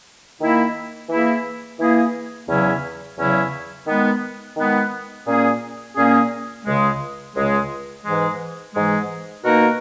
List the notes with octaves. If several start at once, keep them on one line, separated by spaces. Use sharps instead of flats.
D#3 A#3 E4
E3 A#3 E4 G#4
E3 A#3 E4 G#4
E2 C#3 F#3 C#4 E4
E2 C#3 F#3 C#4 E4
D#3 G#3 B3
D#3 G#3 B3
A#2 A#3 C#4 G#4
A#2 A#3 C#4 G#4
C#2 C#3 G#3
C#2 C#3 G#3
G#2 E3 G#3
G#2 E3 G#3
B2 A#3 D#4 F#4 A#4